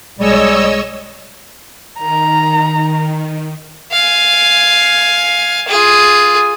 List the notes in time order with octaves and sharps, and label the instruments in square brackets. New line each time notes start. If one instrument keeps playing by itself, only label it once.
[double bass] B1 G#3 [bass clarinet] G3 [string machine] C#5 D#5 E6
[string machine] D#3 [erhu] A#5
[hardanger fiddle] F5 G#5
F4 G#4